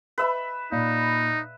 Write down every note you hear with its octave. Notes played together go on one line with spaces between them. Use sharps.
B4 E5 B5
A#2 D#4